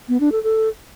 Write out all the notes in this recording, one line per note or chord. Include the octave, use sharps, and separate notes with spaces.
B3
D4
A4
A4